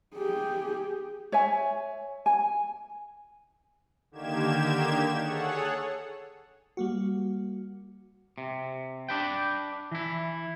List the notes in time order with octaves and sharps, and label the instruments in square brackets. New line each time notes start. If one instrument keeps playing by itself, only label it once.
[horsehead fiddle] G4 G#4
[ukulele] C#5 E5 G#5
G#5
[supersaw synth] D3 D#3 A#3 G4 G#6 E7
G#4 A4 C#5 F#5
[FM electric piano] G3 A#3 F#4
[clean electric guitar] C3
D4 B4 G5
E3 E4